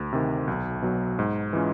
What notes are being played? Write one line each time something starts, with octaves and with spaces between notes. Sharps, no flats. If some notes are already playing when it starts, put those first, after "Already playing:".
Already playing: D2
C3 D#3
B1
B2 F#3
G#2
E3 G#3 C#4 F4